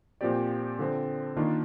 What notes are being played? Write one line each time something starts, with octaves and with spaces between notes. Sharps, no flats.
A#2 F3 C4 G4 D5
D3 F3 C4
D#3 A#3 D4 F4